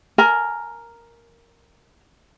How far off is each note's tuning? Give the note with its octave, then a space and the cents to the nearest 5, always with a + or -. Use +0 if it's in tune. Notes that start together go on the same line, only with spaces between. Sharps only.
A#4 +0 G#5 +25